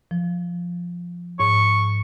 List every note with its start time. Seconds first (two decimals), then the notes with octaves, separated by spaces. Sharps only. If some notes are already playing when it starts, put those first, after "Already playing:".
0.11 F3
1.40 G#2 C#6